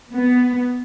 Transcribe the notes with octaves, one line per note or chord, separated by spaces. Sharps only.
B3